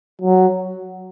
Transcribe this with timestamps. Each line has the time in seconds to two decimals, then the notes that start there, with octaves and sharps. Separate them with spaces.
0.21 F#3